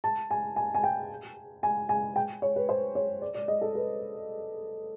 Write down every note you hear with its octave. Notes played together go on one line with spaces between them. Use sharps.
A5
G#5
G#5
G#5
G5
G#5
G#5
G5
C#5
B4
C5
C#5
D5
D5
D#5
A4
B4